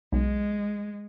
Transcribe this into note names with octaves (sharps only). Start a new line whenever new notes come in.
B1 G#3